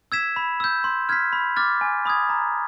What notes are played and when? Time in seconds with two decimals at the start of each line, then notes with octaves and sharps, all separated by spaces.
0.12 E6 G#6 B6 E7
0.36 B5
0.60 E6 G6
0.84 C6
1.09 F6 G#6 B6
1.33 B5
1.56 D6 F6 A6
1.81 G#5
2.05 B5 D#6 G#6
2.29 A#5